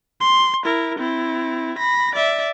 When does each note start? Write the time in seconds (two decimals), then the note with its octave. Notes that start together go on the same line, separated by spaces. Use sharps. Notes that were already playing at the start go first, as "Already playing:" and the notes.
0.21 C6
0.65 E4 A#4
0.99 C4 E4
1.78 B5 A#6
2.15 D5 E5